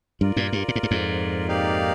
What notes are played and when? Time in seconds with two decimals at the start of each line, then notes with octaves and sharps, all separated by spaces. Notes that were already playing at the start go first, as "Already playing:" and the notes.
0.21 G2 F4 A#4 D5
0.36 G2 A#2
0.53 G2
0.68 A#2
0.75 G#2
0.83 G2
0.91 F2 G#2
1.47 A#3 D#4 G4 D5 F5